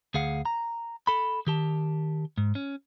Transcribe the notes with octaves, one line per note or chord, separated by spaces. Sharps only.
D2 G#4 F5 F#5
A#5
A4 B5
D#3 G4 A5
G#2
C#4